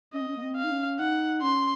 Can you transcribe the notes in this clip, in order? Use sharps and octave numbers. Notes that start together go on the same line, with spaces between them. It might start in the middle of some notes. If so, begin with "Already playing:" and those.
C#4 D#5
C4
C#4
A#3
C4
F5
D#4
C#4
D#4 F#5
C#4 C6